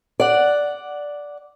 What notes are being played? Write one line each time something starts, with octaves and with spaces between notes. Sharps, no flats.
D5 F#5